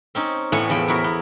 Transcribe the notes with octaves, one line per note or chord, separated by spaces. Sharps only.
C4 C#4 D#4
A2 E3 B3 A4 F#5 G#5
E2 F3 G5 B5
B3 E4 F#4 A#4
B3